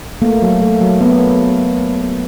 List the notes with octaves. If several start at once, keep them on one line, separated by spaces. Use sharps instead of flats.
A3 A#3
F#3
A3
F#3
A#3 B3